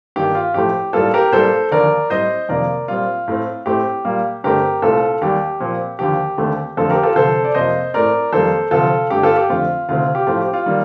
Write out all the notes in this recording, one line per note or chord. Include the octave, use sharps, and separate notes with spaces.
G2 D#3 A#3 G4
F4
A2 F3 A3 G4
A2 G3 A#3 F4 A4
G4 A#4
A2 G3 A#3 A4 C5
D#2 D3 F3 A#3 A#4 D5
A2 G3 C4 C5 D#5
F2 C3 D#3 A#3 A#4 D5
A#2 G3 C4 F4
A2 A3 C4
A2 A3 C4 G4
A#2 G3 A#3
G2 D3 A3 C4 G4 A#4
C2 A#2 A3 C4 F4 A4
D#2 D#3 G3 G4
A#2 F3 C4
D#2 D3 F3 A#3 G4
D#2 D3 A3 C4
F2 D3 A3 C4 F4 A4
G4 A#4
F4 A4
D2 C3 F3 A4 C5
D5
F2 C3 F3 A#3 C5 D#5
A2 A3 C4 A#4 D5
F2 D#3 G3 A#3 A4 C5
D2 C3 F3 F4 A4
G2 D3 A3 G4
F4 A4
G4
F2 D3 A3 C4 F4
D2 C3 D#3 A3 C4 F4
G4
A2 F3 A3 C4 F4
G4
F4
D#3 G3 A#3